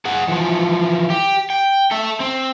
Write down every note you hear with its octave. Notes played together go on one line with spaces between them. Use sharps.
G#4 F#5
E3 F3
G4
G5
A4 E5
C4